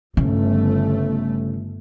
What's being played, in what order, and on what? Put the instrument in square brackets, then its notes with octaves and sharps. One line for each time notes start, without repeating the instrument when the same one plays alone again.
[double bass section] G1 A3 [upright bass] C#3